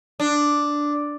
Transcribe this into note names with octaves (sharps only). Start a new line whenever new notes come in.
D4